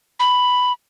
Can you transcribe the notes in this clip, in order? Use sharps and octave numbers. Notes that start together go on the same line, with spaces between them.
B5